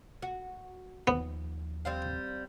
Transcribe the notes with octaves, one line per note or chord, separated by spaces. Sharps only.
F#4
D#2 F3 B3
G3 C4 F5